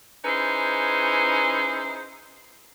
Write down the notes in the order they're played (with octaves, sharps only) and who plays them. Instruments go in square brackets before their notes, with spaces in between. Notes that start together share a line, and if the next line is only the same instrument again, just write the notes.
[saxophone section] C#4 D#4 E4 G#4 B4 C5